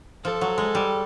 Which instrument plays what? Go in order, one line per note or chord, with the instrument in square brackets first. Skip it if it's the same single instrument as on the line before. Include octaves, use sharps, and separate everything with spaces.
[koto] F3 [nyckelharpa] A4
[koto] F#3
G#3
G3